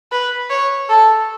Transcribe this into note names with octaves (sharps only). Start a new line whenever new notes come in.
B4
C#5
A4